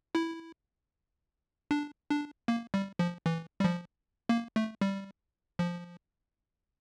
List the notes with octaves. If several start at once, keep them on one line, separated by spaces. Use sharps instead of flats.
E4
D4
D4
A#3
G3
F3
E3
G3
F3
A#3
A3
G3
F3